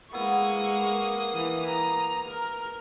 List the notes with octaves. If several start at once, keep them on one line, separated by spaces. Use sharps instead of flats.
G#3 A#3 B3 E4 C#6 D#6
E3
A#5
A#4